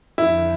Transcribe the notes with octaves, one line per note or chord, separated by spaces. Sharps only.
F2 D3 F3 E4